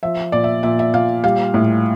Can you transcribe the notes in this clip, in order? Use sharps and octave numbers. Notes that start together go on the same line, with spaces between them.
F3 E5
A#2 D5
E5
A#2 E5
E5
A#2 F5
G3 F5
A2